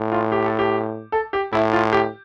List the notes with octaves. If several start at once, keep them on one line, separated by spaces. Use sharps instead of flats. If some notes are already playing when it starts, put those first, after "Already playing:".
Already playing: A2
F4
G4
A4
G4
A4
G4
A2 E4
F4
G4